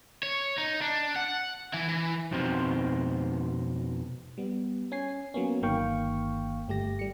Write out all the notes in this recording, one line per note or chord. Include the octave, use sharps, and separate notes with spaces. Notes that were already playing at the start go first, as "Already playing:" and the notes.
C#5
D#4
D4
F#5
E3 E4
E3
F2 B2 C4 D#4 C5
G3 B3
C#4 G#5 C7
F#3 A#3 B3 C#4
G1 D#3 A#3 F5 G5 C#6
G1 A3 G4 A#6
G3 C#7